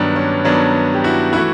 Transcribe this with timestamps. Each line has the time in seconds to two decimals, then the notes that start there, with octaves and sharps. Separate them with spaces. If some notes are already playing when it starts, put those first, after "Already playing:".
Already playing: G2 D#3 F#3 B3 D4
0.16 C#4
0.44 G2 D#3 F#3 B3 D4
0.94 G4
1.04 E4 F#4
1.33 E3 A3 E4 F#4